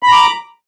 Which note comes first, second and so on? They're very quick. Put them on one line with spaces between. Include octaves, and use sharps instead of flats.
B5 A#5 D6